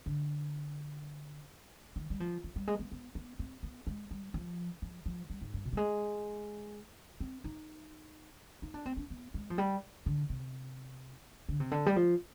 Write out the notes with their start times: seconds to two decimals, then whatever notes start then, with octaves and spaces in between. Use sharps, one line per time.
0.06 D3
1.96 D#3
2.10 G3
2.20 F3
2.44 F3
2.56 G3
2.68 G#3
2.80 B3
2.92 B3
3.15 B3
3.39 C4
3.63 B3
3.87 G#3
4.11 G3
4.34 F3
4.82 F3
5.06 F3
5.30 G3
5.41 G#2
5.54 G2
5.65 B2
5.73 G3
5.77 G#3
7.20 C4
7.44 D#4
8.62 D#4
8.74 D4
8.86 C4
8.97 D4
9.10 B3
9.34 G#3
9.50 F3
9.58 G3
10.06 D3
10.30 C3
11.49 D3
11.60 C3
11.71 D3
11.86 G3
11.96 F3